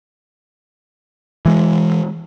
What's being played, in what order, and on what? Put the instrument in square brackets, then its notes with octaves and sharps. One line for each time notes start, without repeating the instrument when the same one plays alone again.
[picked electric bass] E3 G#3